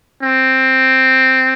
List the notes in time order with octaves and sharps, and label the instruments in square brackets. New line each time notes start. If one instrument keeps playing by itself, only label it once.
[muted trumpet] C4